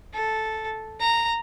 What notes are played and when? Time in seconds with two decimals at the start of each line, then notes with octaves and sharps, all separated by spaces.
0.14 A4
1.00 A#5